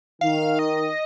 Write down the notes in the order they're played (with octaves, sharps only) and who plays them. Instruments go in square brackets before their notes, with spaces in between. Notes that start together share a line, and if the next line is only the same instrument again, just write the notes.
[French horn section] D#3 [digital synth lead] F5
[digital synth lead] D#5